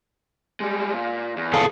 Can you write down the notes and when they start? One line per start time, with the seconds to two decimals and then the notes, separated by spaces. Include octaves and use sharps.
0.60 G3 G#3
0.93 A#2
1.36 E2
1.54 G#4 A4 F5